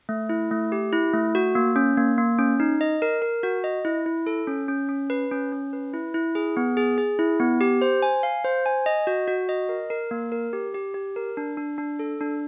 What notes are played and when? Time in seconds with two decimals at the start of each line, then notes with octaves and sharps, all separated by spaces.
0.09 A3
0.29 E4
0.51 A3
0.72 G4
0.93 E4
1.13 A3
1.35 F#4
1.55 A#3
1.76 C#4
1.98 A#3
2.18 A#3
2.39 C#4
2.60 D#4
2.81 D#5
3.02 A#4
3.22 A#4
3.43 F#4
3.64 D#5
3.85 E4
4.06 E4
4.27 A4
4.47 C#4
4.68 C#4
4.89 C#4
5.10 B4
5.31 C#4
5.53 C#4
5.73 B4
5.93 E4
6.14 E4
6.35 G#4
6.57 B3
6.77 G#4
6.98 G#4
7.19 E4
7.40 B3
7.61 G4
7.82 C5
8.02 G#5
8.23 F5
8.44 C5
8.66 G#5
8.86 D#5
9.07 F#4
9.28 F#4
9.49 D#5
9.69 A#4
9.90 A#4
10.11 A#3
10.32 A#4
10.53 G4
10.74 G4
10.94 G4
11.16 A#4
11.37 D4
11.57 D4
11.78 D4
11.99 A4
12.21 D4